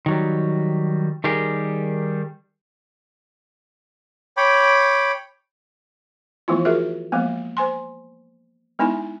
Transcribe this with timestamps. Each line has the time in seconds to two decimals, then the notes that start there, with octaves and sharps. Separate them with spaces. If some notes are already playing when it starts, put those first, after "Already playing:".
0.06 D#3 F#3 G3
1.24 D#3 G3 G4 G#4 A#4
4.37 C#5 G5 B5 D6
6.48 E3 F3 A3 B3 E4 F4
6.65 F4 F#4 G#4 A#4 E5
7.12 F3 G#3 A#3 B3
7.57 C5 G#5 C6
8.79 G#3 B3 D#4 E4 G#5